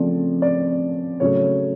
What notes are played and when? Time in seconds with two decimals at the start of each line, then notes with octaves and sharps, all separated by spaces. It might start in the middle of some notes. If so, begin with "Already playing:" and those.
Already playing: C#3 F3 A3 C4 D5
0.42 D5
1.20 C#3 F#3 A3 C#5